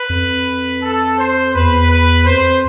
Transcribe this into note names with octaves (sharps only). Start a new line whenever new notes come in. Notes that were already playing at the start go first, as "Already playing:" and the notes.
Already playing: B4
F2
A4
C5
E2 B4
B4
F2 C5